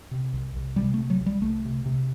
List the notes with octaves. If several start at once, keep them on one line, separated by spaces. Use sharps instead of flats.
C3
C2
C2
C3 G3
A3
C3
F#3
C2
G3
C2 A3
C3
C3